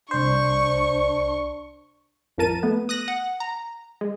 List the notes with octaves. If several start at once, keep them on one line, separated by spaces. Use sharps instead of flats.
C2 D4 C5 C#6
A1 F2 F3 A#4 A5 D#7
A3 B3
D#6 F#6 A#6
F#5
A#5
G#3